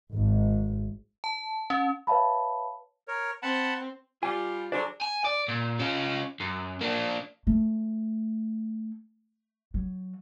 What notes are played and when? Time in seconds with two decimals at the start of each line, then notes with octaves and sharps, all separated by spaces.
0.15 G#1
1.24 A5
1.70 C#4
2.07 B4 C#5 E5 F5 A5 B5
3.08 A#4 C#5
3.43 C4 F#5 A5 B5
4.23 G3 F4 G#5
4.72 D3 F#3 D4 G#4 C5 D5
5.01 G#5
5.24 D5
5.48 A#2
5.79 C#4 F4
6.40 F#2
6.81 A#3 D4
7.47 A3
9.74 F#3